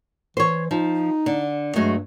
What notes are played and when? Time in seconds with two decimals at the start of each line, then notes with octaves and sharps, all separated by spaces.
0.37 E3 C5 C#5
0.71 F3 D#4
1.26 D3
1.76 G2 F#3 G#3 A3